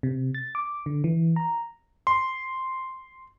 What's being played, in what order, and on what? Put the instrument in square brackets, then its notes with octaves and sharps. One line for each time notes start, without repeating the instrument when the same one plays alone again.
[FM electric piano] C3
A6
D6
D3
E3
A#5
[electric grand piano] C6